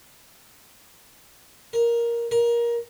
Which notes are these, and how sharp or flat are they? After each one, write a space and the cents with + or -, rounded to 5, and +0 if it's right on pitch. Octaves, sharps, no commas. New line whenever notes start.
A#4 +10
A#4 +20